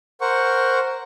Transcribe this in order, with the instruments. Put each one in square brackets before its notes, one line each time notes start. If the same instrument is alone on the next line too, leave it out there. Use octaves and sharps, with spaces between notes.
[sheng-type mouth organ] A#4 C5 F#5 C#6